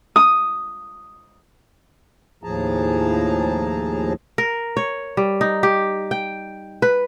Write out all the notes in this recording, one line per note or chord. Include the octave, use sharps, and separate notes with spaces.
D#6
D#2 A2 F3 G#4 A5 A#5
A#4
C#5
G3
D#4
G4
G5
B4